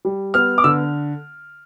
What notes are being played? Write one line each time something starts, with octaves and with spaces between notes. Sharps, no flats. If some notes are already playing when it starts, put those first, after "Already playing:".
G3
B3 F6
D6
D3 E6